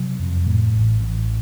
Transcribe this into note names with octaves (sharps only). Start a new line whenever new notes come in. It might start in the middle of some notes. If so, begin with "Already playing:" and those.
Already playing: C3 F#3
F2
A2
A1
A1